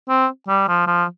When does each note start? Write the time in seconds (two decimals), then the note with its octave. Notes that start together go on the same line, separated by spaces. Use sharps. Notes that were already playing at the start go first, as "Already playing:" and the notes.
0.09 C4
0.48 G3
0.68 F3
0.87 F3